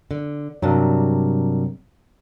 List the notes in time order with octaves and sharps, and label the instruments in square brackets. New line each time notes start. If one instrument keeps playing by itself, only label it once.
[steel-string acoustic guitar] D3
[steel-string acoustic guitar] G2 C3 [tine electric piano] F#3 D4 A#4